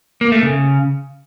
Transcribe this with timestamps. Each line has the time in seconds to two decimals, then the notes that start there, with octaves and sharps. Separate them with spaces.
0.21 A#3
0.32 A3
0.43 C#3